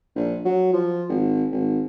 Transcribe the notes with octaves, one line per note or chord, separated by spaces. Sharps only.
A#1
F#3
F3
G#1
G#1